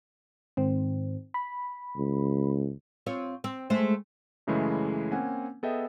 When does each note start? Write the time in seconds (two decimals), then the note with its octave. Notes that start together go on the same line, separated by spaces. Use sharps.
0.57 G#2 D#3 C4
1.34 B5
1.97 C#2
3.06 C4 F4 C#5
3.44 C4
3.70 G#3 A3 C5
4.47 F#2 C#3 E3 G#3 A3 E4
5.12 A#3 C4 C#4 F#5 G#5
5.63 B3 G#4 A4 D#5 E5 G5